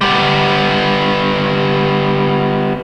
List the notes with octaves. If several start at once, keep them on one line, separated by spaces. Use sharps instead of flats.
G3 B3